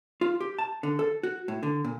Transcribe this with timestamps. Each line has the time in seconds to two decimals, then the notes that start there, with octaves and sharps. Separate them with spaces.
0.21 F4
0.41 G4
0.59 A5
0.83 D3
0.99 A4
1.23 F#4
1.48 A2
1.63 D3
1.84 A#2